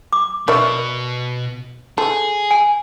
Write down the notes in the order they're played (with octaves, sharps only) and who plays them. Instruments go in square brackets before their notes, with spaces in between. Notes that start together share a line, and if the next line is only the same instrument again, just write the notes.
[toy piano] D6
[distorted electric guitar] B2 [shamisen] A#4 D5 E5 [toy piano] C#6
[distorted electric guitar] G#4 [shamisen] A4
[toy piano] G#5